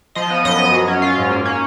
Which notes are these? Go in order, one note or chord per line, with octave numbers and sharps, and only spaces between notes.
F3 D#5
B3
F#2 D#5
F#2
F#3
C#4
F4
G#2
A#3
C#4